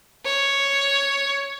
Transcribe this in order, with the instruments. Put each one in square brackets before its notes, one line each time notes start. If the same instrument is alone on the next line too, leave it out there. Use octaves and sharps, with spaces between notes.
[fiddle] C#5